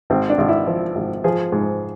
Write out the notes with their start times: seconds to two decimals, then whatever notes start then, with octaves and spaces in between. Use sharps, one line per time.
0.10 G#1 C4
0.30 D4
0.38 G#1
0.48 E4
0.67 F3
0.95 G#1
1.24 F3 G#4
1.52 G#2